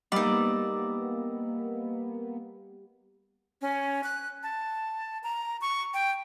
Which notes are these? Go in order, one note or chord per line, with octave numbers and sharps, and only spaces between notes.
G3 A#3 B3 D#4 D5 D#5 E6
C#4
F#6
A5
A#5
C#6
G5